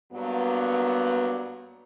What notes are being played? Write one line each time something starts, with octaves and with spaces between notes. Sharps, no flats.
G2 F#3 A#3 B3